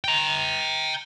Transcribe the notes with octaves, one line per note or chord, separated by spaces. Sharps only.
G5 A#5